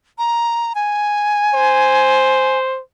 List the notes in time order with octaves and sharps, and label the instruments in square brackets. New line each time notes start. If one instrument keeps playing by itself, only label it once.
[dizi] A#5
G#5
[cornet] C5